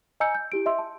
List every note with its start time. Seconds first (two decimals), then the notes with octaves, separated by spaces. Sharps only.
0.20 D#5 G#5 A#5 E6 G6 C#7
0.35 G6
0.52 E4 G4 D7
0.66 D#5 E5 C6 E6
0.78 A5